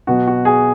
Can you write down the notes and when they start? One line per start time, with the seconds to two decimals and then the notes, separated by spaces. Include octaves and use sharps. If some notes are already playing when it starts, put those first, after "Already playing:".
0.07 B2 F#3 B3 F#4
0.27 F#4
0.45 G#4